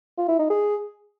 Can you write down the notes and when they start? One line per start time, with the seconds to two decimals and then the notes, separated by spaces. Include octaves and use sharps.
0.17 F4
0.28 E4
0.39 D#4
0.50 G#4